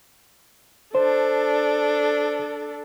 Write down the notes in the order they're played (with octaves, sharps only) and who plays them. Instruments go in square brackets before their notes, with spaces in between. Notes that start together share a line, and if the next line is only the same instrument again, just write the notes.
[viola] D4 A4 [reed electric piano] C5